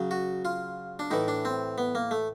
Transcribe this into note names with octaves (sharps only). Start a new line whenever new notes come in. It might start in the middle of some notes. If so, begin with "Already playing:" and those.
Already playing: C#3 F#3
F#4
F4
D4
A2 E3 D#4
D4
C4
B3
A#3
A3